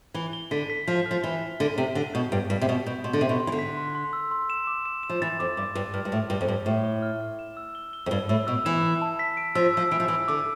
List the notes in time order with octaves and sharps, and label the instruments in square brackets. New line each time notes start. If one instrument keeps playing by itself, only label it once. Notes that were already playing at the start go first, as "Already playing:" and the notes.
[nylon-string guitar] E3 [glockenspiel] G7
[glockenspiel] G7
[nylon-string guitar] D3 [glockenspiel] B6
[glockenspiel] B6
[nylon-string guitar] F3 [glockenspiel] B6
[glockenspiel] F6
[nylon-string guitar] F3
[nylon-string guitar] E3 [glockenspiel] G7
[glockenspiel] B6
[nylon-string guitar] D3 [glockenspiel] G7
[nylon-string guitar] C3 [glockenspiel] B6
[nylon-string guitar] D3 [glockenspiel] G7
[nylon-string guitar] B2 [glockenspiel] G6
[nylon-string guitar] G2 [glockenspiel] D7
[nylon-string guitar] G2 [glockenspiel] B6
[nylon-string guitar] C3
[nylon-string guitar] B2 [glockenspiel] G7
[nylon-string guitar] B2 [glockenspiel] G6
[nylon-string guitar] B2 [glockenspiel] C6
[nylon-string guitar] D3
[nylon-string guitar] C3 [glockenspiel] C6
[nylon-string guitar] B2
[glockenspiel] C6
[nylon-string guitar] E3
D3
[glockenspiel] B6
C6
C6
E6
C6
E7
D6
E7
E7
[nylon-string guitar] F3
[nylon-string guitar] E3 [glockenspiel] A6
[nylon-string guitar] F2 [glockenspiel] D6
[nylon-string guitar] G2 [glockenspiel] D6
[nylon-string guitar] G2 [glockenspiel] D6
[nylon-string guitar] G2 [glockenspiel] F6
[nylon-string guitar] G2
[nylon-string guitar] A2 [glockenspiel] F6
[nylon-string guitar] G2 [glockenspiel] G7
[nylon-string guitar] F2
[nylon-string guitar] G2 [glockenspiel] G7
[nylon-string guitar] A2 [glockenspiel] F6
[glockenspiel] G7
F6
F6
E7
E6
G7
G7
[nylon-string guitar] F2
[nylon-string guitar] G2 [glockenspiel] G7
[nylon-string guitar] A2 [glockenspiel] E6
[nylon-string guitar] B2 [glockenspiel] E6
[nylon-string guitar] E3 [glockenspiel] E7
[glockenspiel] E6
A5
B6
D7
[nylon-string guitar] F3 [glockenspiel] E6
[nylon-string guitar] F3 [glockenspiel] E6
[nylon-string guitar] E3 [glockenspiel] D7
[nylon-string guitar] F3
[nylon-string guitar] E3 [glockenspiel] E6
[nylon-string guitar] D3 [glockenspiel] D6